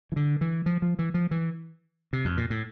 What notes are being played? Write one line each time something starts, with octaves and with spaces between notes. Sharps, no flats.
E3
D3
E3
F3
F3
E3
F3
E3
C3
F2
A#2
A2